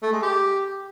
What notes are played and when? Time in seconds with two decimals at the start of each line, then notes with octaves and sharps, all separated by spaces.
0.03 A3
0.12 G#3
0.22 G4